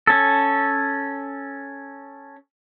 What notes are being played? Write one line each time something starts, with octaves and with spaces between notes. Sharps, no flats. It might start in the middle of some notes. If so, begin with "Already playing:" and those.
C#4 A4